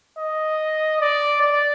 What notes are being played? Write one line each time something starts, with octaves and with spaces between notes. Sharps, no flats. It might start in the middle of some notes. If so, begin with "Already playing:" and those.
D#5
D5
D5